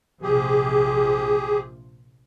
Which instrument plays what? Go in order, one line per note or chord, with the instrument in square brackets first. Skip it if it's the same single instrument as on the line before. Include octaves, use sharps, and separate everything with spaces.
[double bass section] A#1 C3 F3 [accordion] G4 G#4